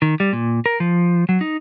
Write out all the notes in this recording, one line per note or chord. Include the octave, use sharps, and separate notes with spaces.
D#3
G3
A#2
A#4
F3
F#3
D#4